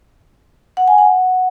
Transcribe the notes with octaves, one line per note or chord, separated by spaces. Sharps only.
F#5
G#5
F#5